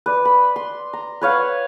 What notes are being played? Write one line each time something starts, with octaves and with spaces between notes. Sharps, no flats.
B4 D5
B5
C6
A#5
B4 C#5 F5 F#5